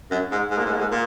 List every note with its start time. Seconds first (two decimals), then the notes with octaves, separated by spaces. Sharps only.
0.11 F#2
0.31 G#2
0.50 G#2
0.58 A#2
0.65 G#2
0.73 A#2
0.79 G#2
0.91 A#2